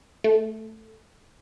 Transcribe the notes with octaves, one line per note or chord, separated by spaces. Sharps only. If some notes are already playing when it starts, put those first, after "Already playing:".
A3